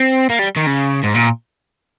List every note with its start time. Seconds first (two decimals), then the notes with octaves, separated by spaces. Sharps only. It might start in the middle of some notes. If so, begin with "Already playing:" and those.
Already playing: C4
0.30 A#3
0.39 G3
0.57 D#3
0.67 C#3
1.04 G#2
1.15 A#2